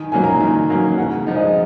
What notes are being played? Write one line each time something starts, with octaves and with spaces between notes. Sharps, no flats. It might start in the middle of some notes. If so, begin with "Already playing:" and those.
Already playing: D#3 G#5
F#3 A#3 C#4 G#5
A#5
G#5
D#3
F#3 A#3 C#4
C#3 F#5
F3 G#3 D#4
D#5